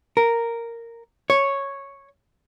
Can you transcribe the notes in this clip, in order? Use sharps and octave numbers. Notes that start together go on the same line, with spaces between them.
A#4
C#5